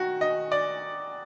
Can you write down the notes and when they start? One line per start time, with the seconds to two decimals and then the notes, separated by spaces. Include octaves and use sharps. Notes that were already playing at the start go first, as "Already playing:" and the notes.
Already playing: D#3 F#4
0.21 D#5
0.52 D5